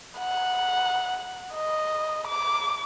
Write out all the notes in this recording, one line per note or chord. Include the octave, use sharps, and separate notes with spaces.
F#5
D#5
D6